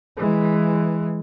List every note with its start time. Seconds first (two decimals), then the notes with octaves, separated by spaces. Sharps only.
0.17 E3 G#3